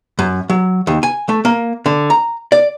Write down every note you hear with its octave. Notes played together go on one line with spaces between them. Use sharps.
F#2
F#3
D#2
G#5
A3
A#3
D3
A#5
D5